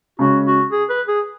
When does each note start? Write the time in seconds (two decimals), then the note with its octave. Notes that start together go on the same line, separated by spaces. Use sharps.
0.19 C#3 G#3 C#4 F#4
0.46 F#4
0.72 G#4
0.90 B4
1.08 G#4